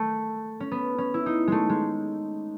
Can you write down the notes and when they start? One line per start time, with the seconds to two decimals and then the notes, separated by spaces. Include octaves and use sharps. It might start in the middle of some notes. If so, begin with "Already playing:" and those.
Already playing: A3
0.60 C#4
0.72 B3
0.98 C#4
1.14 E4
1.26 D#4
1.48 G#3 A3
1.70 G#3